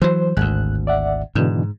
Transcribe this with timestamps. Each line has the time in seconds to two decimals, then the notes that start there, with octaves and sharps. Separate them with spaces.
0.02 E3 F#3 C5
0.37 G#1 D2 G#2 F#6
0.87 D5 E5 F#5
1.35 G#2 B2 D3 E3